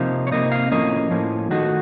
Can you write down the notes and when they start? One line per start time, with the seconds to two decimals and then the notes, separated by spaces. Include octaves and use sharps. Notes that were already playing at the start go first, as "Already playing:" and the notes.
Already playing: C3 F3 A#3 D#4 F5
0.27 C#5
0.31 C3 F3 A#3 D#4 D#5
0.52 F5
0.72 A2 F3 A#3 C#4 D#5
1.11 A2 F3 A#3 C#4
1.50 D#3 A3 D#4 F#4